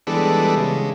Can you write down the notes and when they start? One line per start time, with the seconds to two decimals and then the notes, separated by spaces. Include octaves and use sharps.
0.07 E3 G3 G#3 B3 D4 A4
0.56 C#3 G#3